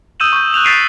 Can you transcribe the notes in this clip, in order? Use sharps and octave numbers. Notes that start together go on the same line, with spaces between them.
D#6 E6 G6 D#7 E7 F#7
C#6 G6
F#6 G6 F7 F#7
G6 A6 B6 C7 D7 D#7